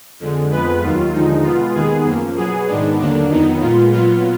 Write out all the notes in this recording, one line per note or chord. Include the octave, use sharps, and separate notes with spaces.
F2 D3 G#3
F2 F3 G#3 B3 B4
D#2 D#3 F#3 F4
D#2 D3 F3 G#3 D#4
B2 G#3 B3 F4
D#2 D#3 G#3 B3 G#4
F#2 F3 A#3
B2 F#3 B3 G#4
G#2 D#3 G#3 B3 D4
D#2 D3 F#3 A#3 D4
F2 D#3 F#3 B3 D#4
A#2 G#3 B3 F4
A#2 F#3 B3 F4